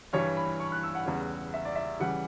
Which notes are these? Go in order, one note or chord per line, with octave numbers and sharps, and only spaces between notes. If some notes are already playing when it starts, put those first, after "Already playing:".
G2 E3 G3 C#5
B5
C#6
F#6
E6
F#5
E2 C#3 G3
E5
D5
E5
C#3 E3 G3 F#5